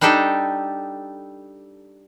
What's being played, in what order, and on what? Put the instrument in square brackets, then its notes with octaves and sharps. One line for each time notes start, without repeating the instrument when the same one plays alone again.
[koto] G3 D4 D#4 G4 A4